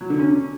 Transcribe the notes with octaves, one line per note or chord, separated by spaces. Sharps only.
F#3
D3
C#4